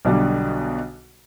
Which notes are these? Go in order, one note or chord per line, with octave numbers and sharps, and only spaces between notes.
B1 B2 D3 G3